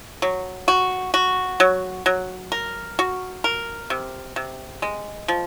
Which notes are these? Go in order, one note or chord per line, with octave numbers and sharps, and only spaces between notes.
F#3
F#4
F#4
F#3
F#3
A#4
F#4
A#4
C3
C3
G#3
F3